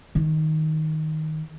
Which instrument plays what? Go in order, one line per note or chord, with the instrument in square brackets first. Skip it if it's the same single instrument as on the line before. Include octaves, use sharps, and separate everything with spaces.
[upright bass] D#3